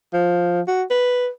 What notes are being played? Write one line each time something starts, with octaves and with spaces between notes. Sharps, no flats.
F3
F#4
B4